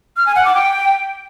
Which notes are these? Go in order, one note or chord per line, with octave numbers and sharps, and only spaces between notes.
F6
G#5
F#5
D6
G5